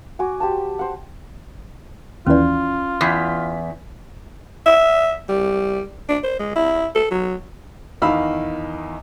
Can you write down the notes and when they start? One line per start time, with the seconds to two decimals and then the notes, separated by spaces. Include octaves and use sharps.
0.19 F#4 G#5 D6
0.40 G4 C5 A5
0.79 C5 F#5
2.27 D#2 E3 C#4 F4 D5
3.01 E2 B6
4.66 E5
5.29 G3
6.09 D4
6.24 C5
6.40 G#3
6.56 E4
6.95 A4
7.11 F#3
8.02 E2 D#3 D#4 F5 B5 E6